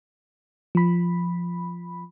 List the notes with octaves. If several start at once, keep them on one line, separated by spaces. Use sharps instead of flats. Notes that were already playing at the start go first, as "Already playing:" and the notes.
F3 B5